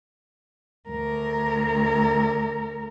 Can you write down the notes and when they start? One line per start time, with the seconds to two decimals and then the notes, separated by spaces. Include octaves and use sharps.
0.90 D2 A#4